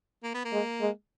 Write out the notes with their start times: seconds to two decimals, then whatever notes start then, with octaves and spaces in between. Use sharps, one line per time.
0.24 A#3
0.35 B3
0.45 A#3
0.52 G#3
0.81 G#3